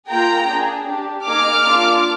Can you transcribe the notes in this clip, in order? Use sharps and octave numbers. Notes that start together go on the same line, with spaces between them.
A#3 F4 G#4 G5 A#5
D4 G#4
D4 G4
A#3 D#4 G#4 D6 F6
A#3 D4 F4